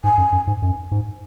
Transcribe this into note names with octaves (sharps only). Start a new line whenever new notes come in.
G#2 G#5
F#2
F#2
G#2
F#2
G#2